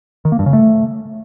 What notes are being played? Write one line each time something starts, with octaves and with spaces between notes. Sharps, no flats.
D#3
A#3
G2
C#3
A3